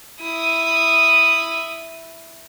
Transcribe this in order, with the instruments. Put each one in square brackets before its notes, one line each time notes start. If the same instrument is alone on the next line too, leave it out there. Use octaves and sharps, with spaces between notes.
[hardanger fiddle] E4 D#6